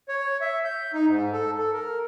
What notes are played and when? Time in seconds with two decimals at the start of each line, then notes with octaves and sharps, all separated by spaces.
0.09 C#5
0.41 E5
0.65 G6
0.94 D#4
1.08 G#2
1.33 A4
1.58 A4
1.73 A#4